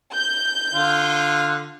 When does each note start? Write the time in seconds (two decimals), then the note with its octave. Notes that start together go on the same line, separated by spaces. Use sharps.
0.13 G6
0.74 D3 F4